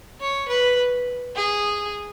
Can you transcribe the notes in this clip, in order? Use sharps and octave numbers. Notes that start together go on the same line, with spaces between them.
C#5
B4
G#4